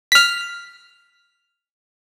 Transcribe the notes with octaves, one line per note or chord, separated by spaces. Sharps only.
F6 B6